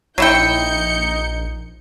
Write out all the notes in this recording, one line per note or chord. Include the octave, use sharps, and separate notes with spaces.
A#1 F#3 D#4 E4 G5 G6 C#7